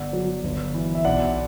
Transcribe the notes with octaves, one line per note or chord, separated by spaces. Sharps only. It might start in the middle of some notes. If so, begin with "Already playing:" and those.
Already playing: G1 D5 F#5
F#3
G1
E3
E5
B1 D5 F#5